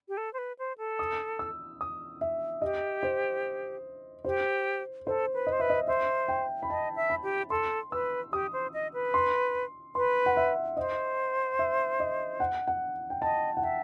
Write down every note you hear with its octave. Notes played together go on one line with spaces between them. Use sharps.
G4
A4
C5
B4
C5
A4
D#6
E6
D#6
E5
G4 D#5
C5
G4 C5
A4 C5
B4
D#5
C5
B4 E5
D#5
C5 E5
G5
B5
D#5 A5
E5
B5
G4
A4 C6
B4 E6
G4 D#6
C5
D#5
B4
C6
B4 C6
F#5
E5
C5 D#5
E5
D#5
F#5
F#5
G5
D#5 A5
F#5
E5 G5